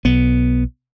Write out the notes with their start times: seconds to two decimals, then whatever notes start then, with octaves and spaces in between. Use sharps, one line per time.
0.05 B1 B3